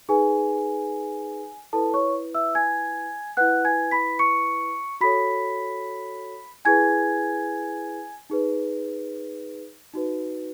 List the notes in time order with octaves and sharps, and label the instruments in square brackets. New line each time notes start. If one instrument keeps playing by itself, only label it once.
[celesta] D#4 G#4 B4 G#5
E4 A4 B4 A5
C#5 C#6
E5 E6
G#5 G#6
E4 B4 F#5 F#6
G#5 G#6
B5 B6
C#6 C#7
F#4 A4 C#5 B5 B6
E4 G#4 B4 G#5 G#6
D#4 G#4 B4
D#4 F#4 B4